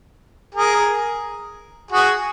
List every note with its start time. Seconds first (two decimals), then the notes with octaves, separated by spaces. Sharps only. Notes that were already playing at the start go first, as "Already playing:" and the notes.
0.55 G#4 A#4
1.91 F#4 G#4